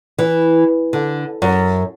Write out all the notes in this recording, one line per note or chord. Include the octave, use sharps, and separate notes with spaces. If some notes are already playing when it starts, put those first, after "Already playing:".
E3
D3
F#2